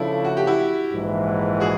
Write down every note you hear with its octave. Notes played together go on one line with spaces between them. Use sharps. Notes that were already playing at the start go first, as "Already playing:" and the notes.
Already playing: C#3 F3 A3 D4 E4
F#4
G4
E4 F#4
A#1 G#2 E3
F#4 G#4